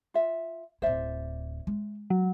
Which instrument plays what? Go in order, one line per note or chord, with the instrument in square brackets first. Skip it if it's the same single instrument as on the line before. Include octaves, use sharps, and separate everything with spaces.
[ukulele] F4 E5
[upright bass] D1 E4 [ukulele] C5 D5 E5
[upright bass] G#3
[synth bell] F#3